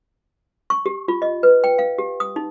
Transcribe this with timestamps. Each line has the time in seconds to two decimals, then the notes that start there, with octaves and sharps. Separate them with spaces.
0.70 C#6
0.86 G4
1.08 F4
1.22 D#5
1.43 B4
1.64 G5
1.78 F5
1.98 G4
2.20 D#6
2.36 D#4